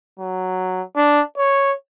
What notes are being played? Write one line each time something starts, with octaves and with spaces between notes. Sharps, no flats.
F#3
D4
C#5